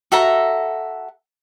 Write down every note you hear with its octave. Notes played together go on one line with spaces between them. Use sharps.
F#4 A4 E5 A#5